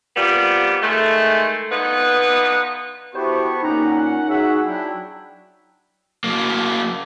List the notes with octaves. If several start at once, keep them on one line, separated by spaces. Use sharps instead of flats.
C3 G3 A#3 B3 F4
D#3 G#3 A3
D3 B3 D#4 F4 B4
B3 E4 F#4 G4 A4 C5 C#6
A#2 C#4 D#4 G4 F#5 A#5
F#5
F#3 G#4 C#5 E5 F#5
F#3 D4 E4 G5
F#3 A#3